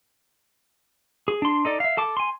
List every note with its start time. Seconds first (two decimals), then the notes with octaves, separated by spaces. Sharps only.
1.28 G#4
1.42 D4 C6
1.65 D#4 A4 D5
1.80 E5 F5
1.97 A4 A5 D6
2.17 G#5 C6